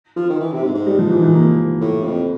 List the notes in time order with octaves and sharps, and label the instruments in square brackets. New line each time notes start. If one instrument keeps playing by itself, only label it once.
[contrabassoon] F3
D#3
E3
C3
G#2
G#2
[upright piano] G3
F3
E3
E3
A#3
[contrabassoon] A2
F2